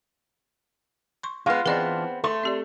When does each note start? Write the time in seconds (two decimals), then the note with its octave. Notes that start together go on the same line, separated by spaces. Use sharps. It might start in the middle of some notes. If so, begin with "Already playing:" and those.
1.23 C6 C#6
1.46 G#3 B3 F4 F5
1.66 E3 B3 C4 D4 F4 G#4 D5 D#5
2.24 A3 A4 C6
2.43 C4 G4 D5